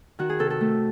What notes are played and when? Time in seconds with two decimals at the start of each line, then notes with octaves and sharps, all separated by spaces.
0.19 D#3 F#4
0.29 G#4
0.39 C3 A4
0.50 A4
0.61 A3